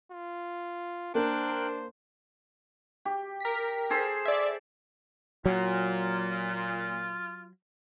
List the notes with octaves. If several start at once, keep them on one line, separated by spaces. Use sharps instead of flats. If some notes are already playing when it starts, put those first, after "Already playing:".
F4
A#3 D4 A#4 C5 G5 F#6
G4
A#4 B6
G#4 A4 C5
D5 E5
A#2 F#3 F4